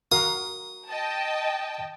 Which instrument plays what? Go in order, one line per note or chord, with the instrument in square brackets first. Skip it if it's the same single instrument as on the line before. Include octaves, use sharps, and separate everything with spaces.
[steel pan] F#4 A#4 F5 [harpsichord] D#6
[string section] D#5 G5 A5